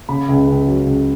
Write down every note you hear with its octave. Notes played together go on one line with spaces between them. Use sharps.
C#3 B5
C#2
C#2
F#3
C#2